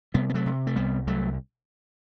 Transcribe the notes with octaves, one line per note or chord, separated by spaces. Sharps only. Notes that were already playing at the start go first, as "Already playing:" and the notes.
C3 G3 B3
B3
F#3 A3
C3
A3
C2 G3 B3
C2 F#3 A3